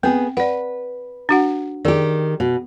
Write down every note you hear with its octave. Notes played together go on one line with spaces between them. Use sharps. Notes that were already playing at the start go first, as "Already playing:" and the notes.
B3 C4 G#4
B4 D5 F#5
D4 F#4 F#5
D#3 G4 G#4 D5
B2